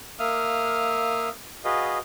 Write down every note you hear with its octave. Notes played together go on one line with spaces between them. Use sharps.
A#3 E5 F5 D#6 F6
F#4 G#4 B4 D#5 F5